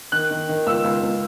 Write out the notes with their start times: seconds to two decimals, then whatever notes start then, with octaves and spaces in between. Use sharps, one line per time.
0.12 D#3 F#6
0.31 D#3
0.49 D#3
0.67 C#2 E6
0.84 C#2
1.02 C#2